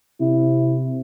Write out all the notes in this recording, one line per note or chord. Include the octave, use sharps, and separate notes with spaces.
C3 E4